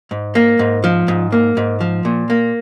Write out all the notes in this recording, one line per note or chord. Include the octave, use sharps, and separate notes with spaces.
G#2
A#3
G#2
F3
G#2
A#3
G#2
F3
A#2
A#3